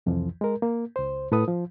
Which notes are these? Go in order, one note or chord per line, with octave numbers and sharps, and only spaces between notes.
C2 F2 E3 F3
G#3 A#4
A#3
C#2 C5
A2 A4 B4 D#6
F3